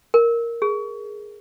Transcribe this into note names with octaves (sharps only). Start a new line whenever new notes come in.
A#4
G#4